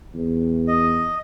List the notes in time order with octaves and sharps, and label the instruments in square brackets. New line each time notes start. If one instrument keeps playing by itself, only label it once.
[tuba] E2
[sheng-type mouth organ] D#5